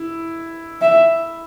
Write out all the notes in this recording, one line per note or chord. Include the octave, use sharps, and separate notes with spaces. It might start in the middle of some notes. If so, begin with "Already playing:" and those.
Already playing: E4
E5